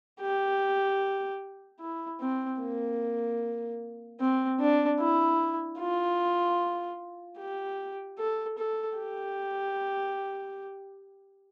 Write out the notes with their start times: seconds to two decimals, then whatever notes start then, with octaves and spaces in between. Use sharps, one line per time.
0.21 G4
1.81 E4
2.20 C4
2.60 A#3
4.20 C4
4.60 D4
5.00 E4
5.79 F4
7.38 G4
8.18 A4
8.58 A4
8.97 G4